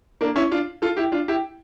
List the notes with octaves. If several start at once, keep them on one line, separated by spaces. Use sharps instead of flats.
A#3 D4
C#4 E4
D4 F4
F4 A4
E4 G4
D4 F4
E4 G4